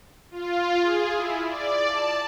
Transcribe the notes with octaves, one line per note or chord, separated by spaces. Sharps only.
F4
G#4
E4
D5
A5